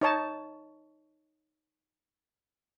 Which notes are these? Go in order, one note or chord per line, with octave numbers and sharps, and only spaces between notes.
D#4 C#5 A5